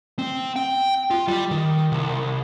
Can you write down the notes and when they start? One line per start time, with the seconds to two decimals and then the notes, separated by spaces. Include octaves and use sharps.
0.19 C4
0.56 G5
1.11 F4
1.28 G3
1.51 D#3
1.92 C2